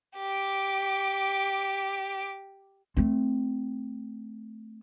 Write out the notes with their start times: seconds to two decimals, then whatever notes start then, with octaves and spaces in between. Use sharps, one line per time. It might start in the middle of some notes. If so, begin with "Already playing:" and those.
0.17 G4 D6
2.96 A3 C4